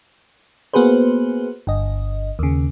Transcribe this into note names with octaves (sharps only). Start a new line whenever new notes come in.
A#3 B3 F#4 G#4 B4 C5
G1 D#5
D#2 C#3